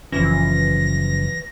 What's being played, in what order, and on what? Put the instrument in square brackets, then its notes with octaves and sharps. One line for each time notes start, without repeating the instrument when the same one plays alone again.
[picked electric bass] F#1 F3 C#4 [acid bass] E3 [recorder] A#6